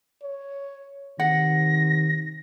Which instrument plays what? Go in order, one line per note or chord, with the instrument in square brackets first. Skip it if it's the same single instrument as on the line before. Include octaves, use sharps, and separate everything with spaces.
[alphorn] C#5
[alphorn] C3 [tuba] D#3 [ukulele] F#5 [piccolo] A#6